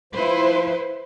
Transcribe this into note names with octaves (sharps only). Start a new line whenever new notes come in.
F3 E4 B4 C5